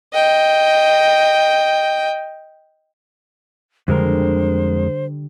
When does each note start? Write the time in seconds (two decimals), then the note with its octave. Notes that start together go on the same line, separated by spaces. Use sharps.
0.13 D#5 G5
3.88 F2 D3 G3 G#3 A#4 C5